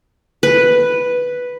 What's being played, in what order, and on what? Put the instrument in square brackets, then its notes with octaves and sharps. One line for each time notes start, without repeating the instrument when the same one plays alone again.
[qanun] B4